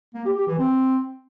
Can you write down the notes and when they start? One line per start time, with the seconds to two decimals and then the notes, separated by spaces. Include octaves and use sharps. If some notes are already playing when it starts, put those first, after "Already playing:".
0.14 A#3
0.25 G4
0.36 G4
0.47 E3
0.58 C4